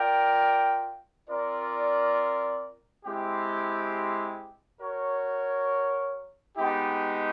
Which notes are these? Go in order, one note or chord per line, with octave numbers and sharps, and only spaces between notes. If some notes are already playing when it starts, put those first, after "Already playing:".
Already playing: F4 A#4 D5 G5
C4 F4 A#4 D5
G#3 C4 E4 G4
F#4 A#4 C#5
G#3 B3 D#4 G4